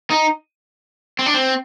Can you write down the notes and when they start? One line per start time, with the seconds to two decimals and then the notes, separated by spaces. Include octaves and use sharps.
0.10 D#4
1.19 C4
1.26 D4
1.34 C4